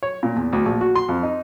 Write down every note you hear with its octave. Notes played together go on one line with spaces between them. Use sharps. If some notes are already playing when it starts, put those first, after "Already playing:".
C#5
A#2
E2
D2
A#1
F#4
C6
F2
D#4